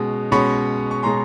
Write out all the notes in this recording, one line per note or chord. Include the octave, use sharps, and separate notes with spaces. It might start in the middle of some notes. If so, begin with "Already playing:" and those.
Already playing: B2 G#3 C#4
B2 G#3 C#4 B5 C#6
C#6
B2 G#3 C#4 A#5 C6